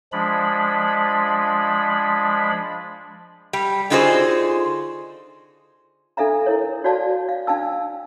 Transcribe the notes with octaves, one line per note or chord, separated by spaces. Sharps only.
F3 G#3 D4 B5
G3
D3 D#4 F4 F#4 G#4 C5
D4 A4 E5 F5 A#5
E4 A#4 C#5
F#4 C#5 D5 F5 A5
F5
D4 F5 G5 A5 E6